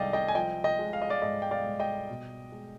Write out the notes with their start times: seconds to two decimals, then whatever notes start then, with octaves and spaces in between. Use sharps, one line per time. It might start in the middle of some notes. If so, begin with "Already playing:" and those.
Already playing: C2 D#3 G#3 D5 D#5 F5 G5
0.13 D#5 G5
0.28 G#5
0.35 F3 D#5 G5
0.64 D#5 G5
0.79 G#3
0.93 F5
1.02 D#5
1.10 D5 F5
1.22 G#2 D#5
1.42 G5
1.51 D5 F5
1.66 G#2
1.80 D#5 G5
2.09 B2
2.52 G#3